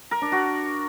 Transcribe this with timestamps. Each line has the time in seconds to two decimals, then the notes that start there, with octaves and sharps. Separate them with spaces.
0.11 A#4
0.22 D4
0.32 F#4